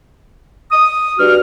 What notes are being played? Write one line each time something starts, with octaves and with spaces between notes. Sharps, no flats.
D#6
G2 F#4 F6